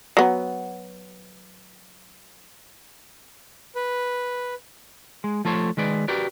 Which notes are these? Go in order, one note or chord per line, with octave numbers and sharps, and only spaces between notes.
F#3 B3
B4
G#3
F3 A3 A4 C5 C#5
D#3 G#3 B4 D5
F#4 G4 A#4 B4 D5